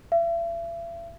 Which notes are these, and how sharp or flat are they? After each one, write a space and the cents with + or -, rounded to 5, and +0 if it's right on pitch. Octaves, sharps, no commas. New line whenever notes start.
E5 +40